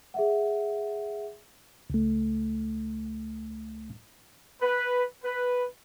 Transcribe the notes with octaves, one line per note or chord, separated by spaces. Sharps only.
G#4 E5 F#5
C#2 A3
B4
B4